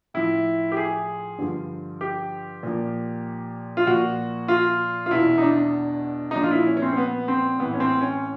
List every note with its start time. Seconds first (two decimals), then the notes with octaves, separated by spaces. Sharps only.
0.14 A2 F3 E4
0.72 G4
0.77 G#4
1.38 G2 D3 F3
2.01 G4
2.63 A#2 F3
3.77 F4
3.87 A#2 F3 F#4
4.48 F4
5.06 F4
5.11 E2 B2 E4
5.38 D#4
5.42 D4
6.31 D#4
6.35 A#2 F3 D4
6.43 F4
6.51 E4
6.66 C#4
6.77 C#4
6.82 C4
6.92 C4
6.97 B3
7.28 C4
7.59 A2 E3 B3
7.74 C#4
7.80 C4
8.01 C#4